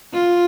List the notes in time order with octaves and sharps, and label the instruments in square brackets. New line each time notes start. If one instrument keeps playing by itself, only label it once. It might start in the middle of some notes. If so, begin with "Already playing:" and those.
[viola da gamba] F4